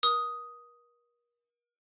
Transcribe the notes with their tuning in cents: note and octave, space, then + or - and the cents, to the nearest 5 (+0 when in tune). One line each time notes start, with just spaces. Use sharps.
A#4 +40 D#6 +5